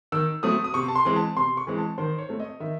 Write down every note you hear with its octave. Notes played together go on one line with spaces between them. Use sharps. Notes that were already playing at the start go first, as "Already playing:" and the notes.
D#3 E6
F#3 A3 C4 D#6
D#6
C3 C#6
A5
C6
E3 G#3 C4
A5
C3 C6
C#6
E3 G#3 C4
A5
D#3 C5
C#5
A3 C4
D#5
D#3 E5